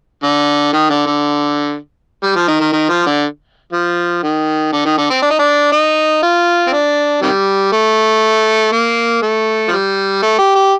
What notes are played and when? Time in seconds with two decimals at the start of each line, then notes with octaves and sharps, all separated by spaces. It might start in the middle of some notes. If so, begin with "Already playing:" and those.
0.23 D3
0.73 D#3
0.90 D3
1.06 D3
2.23 G3
2.36 F3
2.48 D#3
2.61 D#3
2.73 D#3
2.89 F3
3.06 D3
3.73 F3
4.23 D#3
4.72 D3
4.85 D#3
4.98 D3
5.10 C4
5.22 D4
5.31 D#4
5.39 D4
5.72 D#4
6.23 F4
6.67 C4
6.73 D4
7.22 C3 D#3 G3
7.72 A3
8.72 A#3
9.22 A3
9.68 F3
9.72 G3
10.22 A3
10.39 G4
10.55 G4